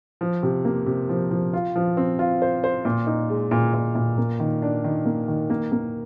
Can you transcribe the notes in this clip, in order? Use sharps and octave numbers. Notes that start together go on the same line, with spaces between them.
F3
C3
A#3
C3
F3
F3
F4
F3
C4
F4
C5
C5
A#2
D#4
G#3
A#2
A#2
A#2
A#3
D#3
D4
D#3
A#3
D#3
A#3
A#3